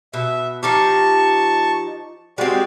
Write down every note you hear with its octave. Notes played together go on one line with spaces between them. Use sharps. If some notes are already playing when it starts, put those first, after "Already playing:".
B2 E5
F3 D#4 G4 A5 C#6
G#3 C4 F#4 G4 D5